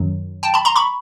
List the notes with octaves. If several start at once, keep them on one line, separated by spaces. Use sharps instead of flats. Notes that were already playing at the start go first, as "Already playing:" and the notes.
Already playing: F#2 D#3 F#3
G5 A5
A5 B5
A#5 C6
B5 C#6